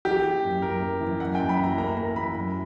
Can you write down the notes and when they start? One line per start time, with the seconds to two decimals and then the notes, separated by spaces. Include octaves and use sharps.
0.05 E3 G4
0.25 A#3
0.44 F#2
0.62 F#2 A#4
0.82 A#3
1.01 E3
1.20 F#2 F#5
1.35 F#2 G5
1.49 B5
1.59 E3 A#5
1.78 A#3 A#5
1.97 A#3 A#5
2.16 E3 B5
2.35 F#2